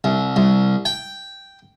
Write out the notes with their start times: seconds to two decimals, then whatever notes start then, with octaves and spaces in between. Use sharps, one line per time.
0.04 C2
0.36 C2
0.85 G5